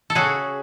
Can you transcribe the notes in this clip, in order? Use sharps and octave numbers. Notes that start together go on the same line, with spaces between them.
A4
C#3 F#4 G#4